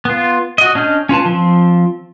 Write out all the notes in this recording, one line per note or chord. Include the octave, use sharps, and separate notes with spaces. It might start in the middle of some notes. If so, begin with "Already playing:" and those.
B3 F4
F#4 D#5
C#4 D4 D#5 F6 G6
C#4 F4 B4 A5
F3 C4